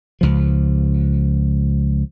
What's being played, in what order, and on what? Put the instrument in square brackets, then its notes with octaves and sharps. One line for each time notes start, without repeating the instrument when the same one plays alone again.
[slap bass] C#2 F3